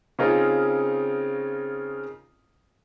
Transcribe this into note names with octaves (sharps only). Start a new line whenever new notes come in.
C#3 C4 C#4 D#4 F4 A#4